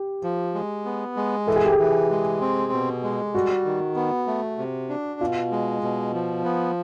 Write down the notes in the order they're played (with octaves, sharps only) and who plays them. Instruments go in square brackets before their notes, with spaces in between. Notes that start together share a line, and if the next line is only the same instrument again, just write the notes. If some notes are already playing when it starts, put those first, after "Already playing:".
Already playing: [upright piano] G4
[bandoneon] F3
G#3
B3
G#3
[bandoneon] E3 [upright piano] A4
[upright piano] G#4
G4
G#4
[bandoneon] E3
G#3
C4
B2
G#3
[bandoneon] G3 [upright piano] F#4
[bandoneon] D#3
B3
A3
C3
D4
[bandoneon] B2 [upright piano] F4
[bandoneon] G#3
B2
F3
B3